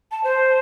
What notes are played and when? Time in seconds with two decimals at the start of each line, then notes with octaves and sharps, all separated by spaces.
0.12 A5
0.24 C5